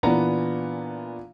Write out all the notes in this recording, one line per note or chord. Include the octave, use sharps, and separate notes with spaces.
A#2 E3 B3 D4 A#5